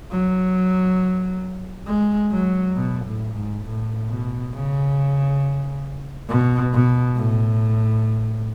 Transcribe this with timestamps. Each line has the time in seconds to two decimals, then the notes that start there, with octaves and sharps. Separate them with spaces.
0.11 F#3
1.87 G#3
2.32 F#3
2.76 B2
3.05 A2
3.34 G#2
3.65 A2
4.09 B2
4.53 C#3
6.29 B2
6.73 B2
7.17 A2